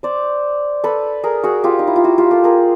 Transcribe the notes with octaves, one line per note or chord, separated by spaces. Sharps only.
C5 D5
A4 B4
G#4 A#4
F#4 G#4
F4 G4
D#4
E4
F4
E4 F#4
F4 G4
G4 A4
G#4 A#4